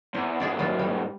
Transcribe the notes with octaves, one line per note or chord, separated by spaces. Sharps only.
E2 C5
E2 G#2 G#4 D5 E5
F#3 G3 F4
G3